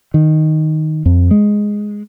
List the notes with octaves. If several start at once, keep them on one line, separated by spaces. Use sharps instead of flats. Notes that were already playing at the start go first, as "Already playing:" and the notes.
D#3
F2
G#3